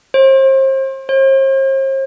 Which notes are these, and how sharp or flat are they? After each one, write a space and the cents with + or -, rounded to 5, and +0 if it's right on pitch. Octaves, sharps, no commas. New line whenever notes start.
C5 +35
C5 +45